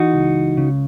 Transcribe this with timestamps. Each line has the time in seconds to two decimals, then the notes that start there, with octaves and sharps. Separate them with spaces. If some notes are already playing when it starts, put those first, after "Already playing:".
Already playing: E3 D#4 F#4
0.14 C#2
0.57 C#3